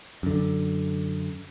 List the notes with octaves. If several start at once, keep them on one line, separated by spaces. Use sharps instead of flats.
F#2 D3